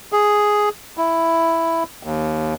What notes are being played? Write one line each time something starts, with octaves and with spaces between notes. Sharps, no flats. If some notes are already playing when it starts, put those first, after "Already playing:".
G#4
E4
D#2